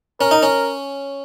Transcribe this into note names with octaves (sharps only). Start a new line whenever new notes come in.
C#4 A#4
D#4
C#4